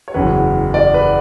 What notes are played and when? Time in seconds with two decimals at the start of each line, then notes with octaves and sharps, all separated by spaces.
0.08 C#5
0.14 F#1 E2 C#3 F#3 B4
0.74 D5
0.94 B4